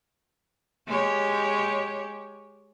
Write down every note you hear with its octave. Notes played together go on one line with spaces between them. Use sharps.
G#3 G4 C#5